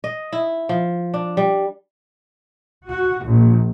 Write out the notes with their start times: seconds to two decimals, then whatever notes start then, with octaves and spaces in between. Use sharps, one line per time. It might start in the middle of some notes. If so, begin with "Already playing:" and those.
0.04 D#5
0.33 E4
0.69 F3
1.14 D4
1.37 G3
2.88 F#4
3.25 A#1